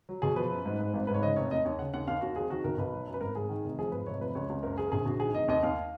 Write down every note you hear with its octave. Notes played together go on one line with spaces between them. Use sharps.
F#3
B2 G#4
F3 B4
F#2
G#2
G#2
G#1
G#2 B4
C#5
C#3 D#5
F1 C#5
D#2 D#5
D#2 C#5
C#3 F#5
D#2 F#5
D#2 F5
D#2 F#4
F2 G#4
D#3 F#4
B1 A#4
B1 B4
F#3
F#2
B4
G#1 A#4
G#1 G#4
D#3
F1
F3 G#4
G#1 B4
F1 C#5
F3 B4
C#2 C#5
C#2
F#1 A#4
F#1 G#4
A#4
A#1 G#4
A#1 F#4
D#3 G#4
F1 D#5
D#2 D#5
D#2 F5